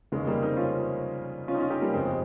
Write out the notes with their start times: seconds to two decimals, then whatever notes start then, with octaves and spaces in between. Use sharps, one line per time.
0.12 F1 D#2 C#3 G#3
0.27 G3 A#3
0.42 C4 D#4
0.57 C#4 F4
1.48 C#4 F4
1.54 D#4
1.59 C#4 F4
1.70 D#4 G4
1.82 G3 A#3
1.93 G1 F2 C#3 G#3 C4